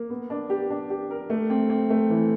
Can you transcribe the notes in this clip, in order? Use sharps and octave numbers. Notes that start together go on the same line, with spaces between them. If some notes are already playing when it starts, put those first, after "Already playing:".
Already playing: A#3
B3
D4
G4
D4
G4
A#4
A3
C4
C4
A3
E3